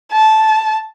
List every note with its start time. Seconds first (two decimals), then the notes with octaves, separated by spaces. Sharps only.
0.12 A5